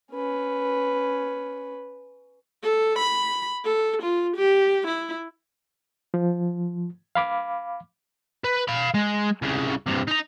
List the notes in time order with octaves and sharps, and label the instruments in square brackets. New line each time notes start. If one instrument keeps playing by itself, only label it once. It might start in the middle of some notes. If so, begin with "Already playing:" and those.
[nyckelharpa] C#4 B4
[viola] A4
B5
A4
F4
G4
E4
[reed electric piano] F3
F5 B5 D6
[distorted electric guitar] B4
F5 B5
G#3
C2 C#3
G2 C3
D#4 A#5